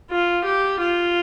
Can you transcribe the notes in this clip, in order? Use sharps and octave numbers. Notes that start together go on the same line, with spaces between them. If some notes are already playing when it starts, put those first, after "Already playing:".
F4
G4
F4